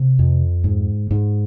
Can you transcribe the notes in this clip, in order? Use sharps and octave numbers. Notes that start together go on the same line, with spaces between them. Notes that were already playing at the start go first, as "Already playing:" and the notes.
Already playing: C3
F2
G#2
G#2